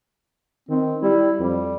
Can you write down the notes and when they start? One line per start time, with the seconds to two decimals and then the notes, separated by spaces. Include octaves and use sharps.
0.69 D#3 C4
1.03 G3 E4
1.39 F2 G3